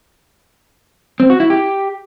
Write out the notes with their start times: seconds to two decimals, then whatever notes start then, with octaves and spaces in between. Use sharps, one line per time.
1.20 C4
1.30 F#4
1.40 E4
1.50 G4